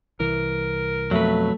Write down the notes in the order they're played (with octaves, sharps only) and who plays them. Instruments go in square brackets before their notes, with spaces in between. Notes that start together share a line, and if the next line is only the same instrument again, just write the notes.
[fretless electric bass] C2 E3 [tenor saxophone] A#4
[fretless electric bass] F2 B2 [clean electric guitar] F#3 B4 [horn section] A3